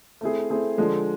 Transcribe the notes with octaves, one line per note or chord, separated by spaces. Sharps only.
A3 C4 E4 G#4
A3 C4 E4 G#4
D3 F3 G#3